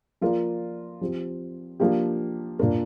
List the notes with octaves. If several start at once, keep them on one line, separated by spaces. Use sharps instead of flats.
F3 A#3 F4 A#4 D5
F3 C4 G4
F3 A#3 D4 G4
A#2 A#3 D4 A#4